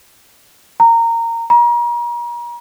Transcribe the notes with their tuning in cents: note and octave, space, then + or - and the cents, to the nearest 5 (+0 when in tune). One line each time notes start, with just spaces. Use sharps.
A#5 -20
A#5 +35